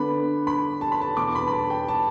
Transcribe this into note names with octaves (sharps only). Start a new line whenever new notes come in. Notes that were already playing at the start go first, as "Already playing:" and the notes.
Already playing: D3 B3 D4 B5
B5
A5
B5
A5
E2 B2 B3 D4 D6
B5
B5
A5
G5
A5